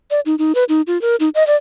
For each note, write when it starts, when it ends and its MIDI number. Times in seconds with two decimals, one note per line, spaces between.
0.11 0.20 74
0.26 0.35 63
0.39 0.52 63
0.55 0.64 71
0.69 0.82 63
0.87 1.00 65
1.02 1.16 70
1.20 1.29 63
1.35 1.46 75
1.47 1.56 74